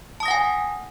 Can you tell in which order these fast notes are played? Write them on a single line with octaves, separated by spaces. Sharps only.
A5 D#6 A#6 F#5 G#5